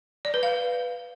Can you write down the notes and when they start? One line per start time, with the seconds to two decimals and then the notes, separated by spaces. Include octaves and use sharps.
0.25 D5
0.34 B4
0.43 F5